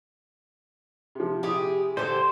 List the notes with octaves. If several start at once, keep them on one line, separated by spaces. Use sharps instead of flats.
C3 F3
C3 E4 G4 G#4
D3 G4 A4 C5